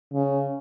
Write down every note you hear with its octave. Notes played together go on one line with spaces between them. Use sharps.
C#3